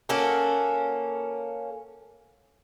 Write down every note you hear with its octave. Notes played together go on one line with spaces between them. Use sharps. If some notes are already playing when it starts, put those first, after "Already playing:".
A#3 C#4 F#4 A4